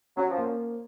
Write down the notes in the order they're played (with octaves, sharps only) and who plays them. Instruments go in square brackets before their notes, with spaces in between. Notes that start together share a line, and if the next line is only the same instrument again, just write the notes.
[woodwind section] F#3 [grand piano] C#4
[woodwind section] F3
[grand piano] A#3